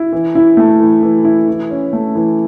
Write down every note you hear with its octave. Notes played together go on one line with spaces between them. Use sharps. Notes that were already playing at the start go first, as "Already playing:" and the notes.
Already playing: E4
E3
E4
A3
E3
E3
E4
E3
C#4
A3
E3